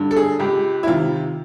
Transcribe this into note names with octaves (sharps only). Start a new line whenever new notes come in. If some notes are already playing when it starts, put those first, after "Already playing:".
Already playing: G2 D3
A4
G#4
C#2 G4
E4
C3 D#3 F4